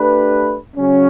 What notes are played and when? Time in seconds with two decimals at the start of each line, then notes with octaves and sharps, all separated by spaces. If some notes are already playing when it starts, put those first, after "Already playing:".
Already playing: A3 D4 G4 B4
0.76 C#3 F#3 C#4